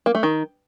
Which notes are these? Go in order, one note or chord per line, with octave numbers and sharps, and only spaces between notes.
A#3
A3
D#3